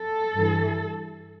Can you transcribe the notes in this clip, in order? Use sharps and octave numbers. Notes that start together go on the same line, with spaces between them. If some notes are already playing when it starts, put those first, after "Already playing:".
Already playing: A4
G2 E3